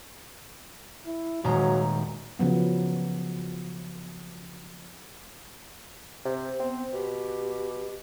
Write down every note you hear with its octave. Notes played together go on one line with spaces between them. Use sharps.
E4
D#1 F#3 G#3 A#5
C#3 F3 F#3 B3
C3
B3 C4
B2 G4